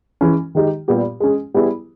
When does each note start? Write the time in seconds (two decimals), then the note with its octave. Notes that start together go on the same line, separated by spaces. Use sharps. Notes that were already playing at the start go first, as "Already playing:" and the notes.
0.21 E3 G#3 C#4
0.55 D#3 G#3 D#4 G4
0.88 A#2 G3 B3 G4
1.20 G#3 C#4 G#4
1.54 G3 B3 E4 G#4